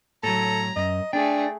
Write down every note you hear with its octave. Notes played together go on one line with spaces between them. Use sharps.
A2 F#3 A4 A#5
F#2 D#5
A3 D4 G#4 G5